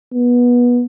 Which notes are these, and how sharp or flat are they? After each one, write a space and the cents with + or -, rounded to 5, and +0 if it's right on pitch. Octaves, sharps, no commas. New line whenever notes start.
B3 -20